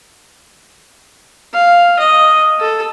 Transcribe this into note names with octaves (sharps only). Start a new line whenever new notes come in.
F5
D#5
A4